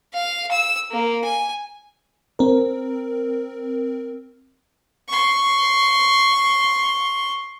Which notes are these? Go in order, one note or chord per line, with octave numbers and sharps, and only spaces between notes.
F5
E6
A#3
G#5
C4 A#4
C6 C#6